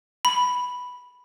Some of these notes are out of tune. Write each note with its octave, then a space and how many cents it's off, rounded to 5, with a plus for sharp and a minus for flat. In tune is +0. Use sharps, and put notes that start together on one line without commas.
B5 +0